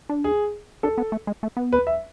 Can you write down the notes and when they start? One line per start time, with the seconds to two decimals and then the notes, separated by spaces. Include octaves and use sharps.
0.09 D4
0.24 G#4
0.83 D4 A4
0.98 B3
1.12 A3
1.27 G#3
1.43 A3
1.57 B3
1.73 B4
1.87 E5